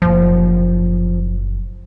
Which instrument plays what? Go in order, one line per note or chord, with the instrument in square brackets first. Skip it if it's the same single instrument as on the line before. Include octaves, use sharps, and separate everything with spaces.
[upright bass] F#1 A#2 [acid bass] F3